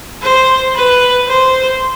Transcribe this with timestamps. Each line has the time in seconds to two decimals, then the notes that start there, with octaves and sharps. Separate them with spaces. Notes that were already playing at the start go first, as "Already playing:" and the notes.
0.22 C5
0.75 B4
1.28 C5